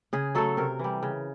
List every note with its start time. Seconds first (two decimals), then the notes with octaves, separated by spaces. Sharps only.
0.13 C#3 G#4
0.35 F#3 A3 A4
0.57 C3 A#4
0.79 E3 G3
1.03 C#3